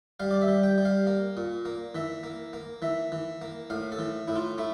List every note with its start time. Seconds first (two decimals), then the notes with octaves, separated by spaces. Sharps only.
0.20 G3 F5
0.31 D5
0.42 E5
0.48 G3
0.63 G5
0.78 G3
0.85 F5
1.07 A#3
1.37 A#2
1.65 A#3
1.95 E3 E5
2.23 A#3
2.53 A#3
2.82 E3 E5
3.12 E3
3.42 A#3
3.70 A2 F5
3.92 A4
3.99 E3
4.28 A2 E4
4.36 F4
4.58 A3 E4